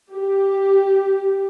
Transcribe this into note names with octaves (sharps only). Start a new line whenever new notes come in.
G4